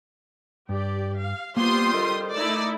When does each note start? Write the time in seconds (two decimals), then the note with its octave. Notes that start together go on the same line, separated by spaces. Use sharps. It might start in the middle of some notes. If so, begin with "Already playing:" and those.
0.69 G2 G4 D5
1.19 F5
1.57 G3 A#3 B3 F4 G4 C5 C6 D#6
1.94 A4 A#4 D#5
2.34 A3 D#4 E4 D5 E6